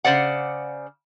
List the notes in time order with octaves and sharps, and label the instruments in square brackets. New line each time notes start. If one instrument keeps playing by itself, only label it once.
[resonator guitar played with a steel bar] C#3 C5 D5 F#5